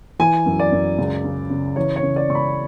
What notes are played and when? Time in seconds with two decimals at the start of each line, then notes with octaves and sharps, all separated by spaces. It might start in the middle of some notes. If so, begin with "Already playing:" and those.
0.19 E3 G#5
0.46 F#2
0.59 D5
0.72 F#2
0.98 C#2
1.24 C#3
1.50 C#3
1.76 E3 C#5
1.96 C#5
2.03 C#3
2.16 D5
2.29 C#2 C#6
2.35 B5